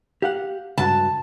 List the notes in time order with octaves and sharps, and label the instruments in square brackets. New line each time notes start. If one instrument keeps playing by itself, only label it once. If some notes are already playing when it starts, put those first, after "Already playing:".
[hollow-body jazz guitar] G4 F5 F#5
[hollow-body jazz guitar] C#2 G2 F#4 [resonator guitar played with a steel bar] A5